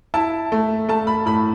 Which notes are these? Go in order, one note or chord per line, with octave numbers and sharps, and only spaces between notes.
E4 A5
A3
A3 A5
B5
A2 B5